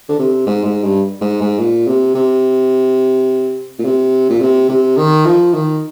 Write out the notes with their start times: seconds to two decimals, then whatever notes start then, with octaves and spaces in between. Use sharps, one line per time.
0.09 D3
0.19 C3
0.47 G#2
0.65 G#2
0.84 G2
1.21 G#2
1.41 G#2
1.59 A#2
1.87 C3
2.15 C3
3.79 A#2
3.85 C3
4.30 A#2
4.41 C3
4.69 C3
4.97 D#3
5.26 F3
5.54 D#3